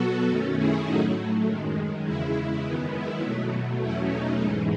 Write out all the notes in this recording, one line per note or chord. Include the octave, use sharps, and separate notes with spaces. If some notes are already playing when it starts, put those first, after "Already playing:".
Already playing: B2 F#3 B3 F#4 A4
F#2 D#3 A3 C#4
E4 G#4
A2 F#3 A3 D#4 F#4
F#2 D#3 G#3
E2 C#3 G#3 E4
F#2 D#3 G#3 B3
E4
B2 F#3 A3
E2 B2 F#3 A3 C#4 E4
D#4
G#2 E3 G#3